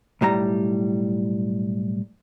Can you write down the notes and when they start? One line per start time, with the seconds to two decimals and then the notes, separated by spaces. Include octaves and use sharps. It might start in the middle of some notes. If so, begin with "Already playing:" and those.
0.21 B1 A2 G3 A#5